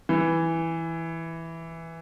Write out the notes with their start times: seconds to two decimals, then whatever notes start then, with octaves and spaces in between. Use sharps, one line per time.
0.09 E3